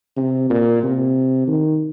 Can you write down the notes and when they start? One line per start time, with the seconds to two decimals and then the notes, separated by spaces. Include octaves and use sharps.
0.17 C3
0.50 A#2
0.83 C3
1.47 D#3